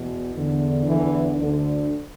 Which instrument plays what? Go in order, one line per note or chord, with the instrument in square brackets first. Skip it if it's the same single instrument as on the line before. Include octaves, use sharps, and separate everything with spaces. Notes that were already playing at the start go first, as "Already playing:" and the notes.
Already playing: [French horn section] E2 B2
E2 D3
E2 D3 E3 E4
D2 D3